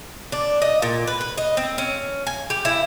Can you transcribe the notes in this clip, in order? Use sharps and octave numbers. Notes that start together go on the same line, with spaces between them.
D4
D#5
A#2
B4
B4
D#5
C4
C#4
G#5
G4
E4